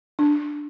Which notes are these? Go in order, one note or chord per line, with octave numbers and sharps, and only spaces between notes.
D4